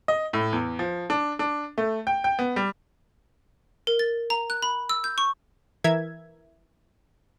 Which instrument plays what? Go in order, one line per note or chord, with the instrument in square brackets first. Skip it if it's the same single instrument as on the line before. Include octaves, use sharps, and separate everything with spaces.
[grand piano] D#5
A2
E2
F3
D4
D4
A3
G5
G5
B3
G3
[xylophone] A#4
A6
A#5
F#6
B5
E6
G6
C#6
[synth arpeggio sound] E3 A#4 E5 G#6